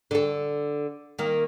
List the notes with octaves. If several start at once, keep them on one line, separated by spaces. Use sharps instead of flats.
D3 A4
D#3 A#3